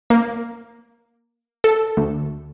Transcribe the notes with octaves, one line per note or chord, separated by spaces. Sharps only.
A#3
A4
D2